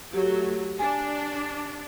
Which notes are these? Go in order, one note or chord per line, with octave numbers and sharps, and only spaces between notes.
F#3 A3 G4
D4 G#5